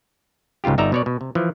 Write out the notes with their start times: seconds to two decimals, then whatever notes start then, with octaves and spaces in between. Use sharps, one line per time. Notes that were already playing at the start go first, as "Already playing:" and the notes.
0.64 C#2 G#2 C#3 F4 G4
0.78 G1 D#4 D5 E5 A#5
0.92 B2 C#5 D5
1.06 B2
1.21 C3
1.35 E3 F3